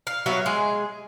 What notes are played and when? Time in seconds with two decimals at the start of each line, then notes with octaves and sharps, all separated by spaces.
0.07 F5
0.26 F#3 B3 E5 F5
0.46 G#3 G#4